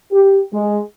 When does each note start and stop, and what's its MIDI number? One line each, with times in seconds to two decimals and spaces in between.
0.12 0.40 67
0.53 0.79 56